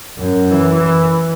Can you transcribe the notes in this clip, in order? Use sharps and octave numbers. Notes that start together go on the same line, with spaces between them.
F#2
E3